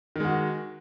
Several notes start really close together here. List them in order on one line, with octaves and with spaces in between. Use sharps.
D#3 G#3 F#4